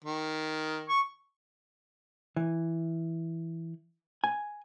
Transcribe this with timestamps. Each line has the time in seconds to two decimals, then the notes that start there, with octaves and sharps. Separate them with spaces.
0.04 D#3
0.89 C#6
2.36 E3
4.24 G#5